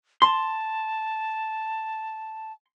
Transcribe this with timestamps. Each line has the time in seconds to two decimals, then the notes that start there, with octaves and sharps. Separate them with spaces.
0.22 A5 C6